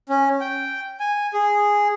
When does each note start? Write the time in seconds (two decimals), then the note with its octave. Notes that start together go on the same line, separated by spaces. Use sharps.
0.09 C#4
0.41 G5
1.00 G#5
1.33 G#4